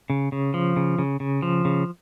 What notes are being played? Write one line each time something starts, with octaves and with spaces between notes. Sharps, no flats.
C#3
C#3
F3
C#3
C#3
C#3
F3
C#3